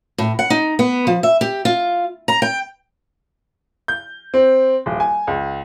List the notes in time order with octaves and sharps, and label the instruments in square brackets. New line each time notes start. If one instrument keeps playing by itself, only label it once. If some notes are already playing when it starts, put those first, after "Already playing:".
[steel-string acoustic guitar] A2
F#5
D#4
B3
F3
E5
G4
F4
A#5
G5
[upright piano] G6
C4
D#1
G#5
C#2